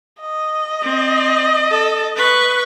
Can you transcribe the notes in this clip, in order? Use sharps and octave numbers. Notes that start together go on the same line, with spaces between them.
D#5
C4
A4
B4 C#6